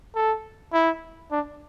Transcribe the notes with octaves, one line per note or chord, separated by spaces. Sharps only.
A4
E4
D4